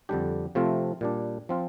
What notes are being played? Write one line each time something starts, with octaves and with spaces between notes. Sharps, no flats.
F2 D3 G3 D4 G4
C3 F3 A3 C4 F4
A#2 G3 D4
F3 C4 F4